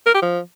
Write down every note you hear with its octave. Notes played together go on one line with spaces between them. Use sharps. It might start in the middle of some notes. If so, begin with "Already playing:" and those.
A#4
G4
F3